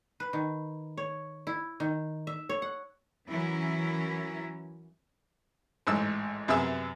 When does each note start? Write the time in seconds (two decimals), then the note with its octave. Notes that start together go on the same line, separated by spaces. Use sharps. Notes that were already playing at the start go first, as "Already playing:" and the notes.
0.20 B4
0.33 D#3
0.97 C#5
1.47 E4
1.80 D#3
2.27 E5
2.49 C#5
2.62 F#5
3.29 E3 F#3 C#4 E4 A#4
5.87 A1 G#2 E6
6.48 F#2 C3 B3 G#4 E5 E6